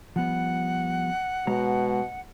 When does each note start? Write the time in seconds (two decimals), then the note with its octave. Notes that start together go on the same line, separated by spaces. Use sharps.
0.16 F3 G3 B3 F#5
1.47 B2 G#3 C#5 A#5